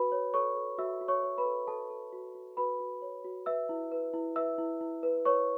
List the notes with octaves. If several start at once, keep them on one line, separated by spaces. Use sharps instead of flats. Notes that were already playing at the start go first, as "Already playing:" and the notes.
Already playing: F#4 B4 B5
C#5
A4 C#5 C#6
A4
F#4 E5 E6
F#4
C#5 C#6
C#5
B4 B5
A4
A4 C#5 A5
A4
F#4
F#4
F#4 B4 B5
F#4
C#5
F#4
B4 E5 E6
E4
B4
E4
B4 E5 E6
E4
E4
B4
B4 C#5 C#6